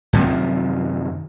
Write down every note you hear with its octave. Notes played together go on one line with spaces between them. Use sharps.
F#2 C3 D#3 F3